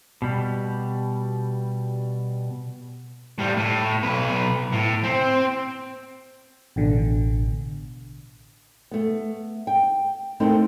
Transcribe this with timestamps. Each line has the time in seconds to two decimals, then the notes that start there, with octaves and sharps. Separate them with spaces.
0.22 B2 G3
3.38 A2 G3
3.57 A2
4.03 B1 B4
4.72 A2
5.04 C4
6.76 A1 B2 D3
8.91 A3 B3
9.67 G5
10.40 A3 C4 D#4 E4 A4 A#4